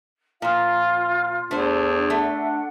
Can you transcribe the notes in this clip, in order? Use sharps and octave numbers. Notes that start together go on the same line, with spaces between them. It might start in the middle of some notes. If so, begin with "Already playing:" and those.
A#2 F3 F4 F5
E2 A3 D4 C5
A3 D4 E5 F#5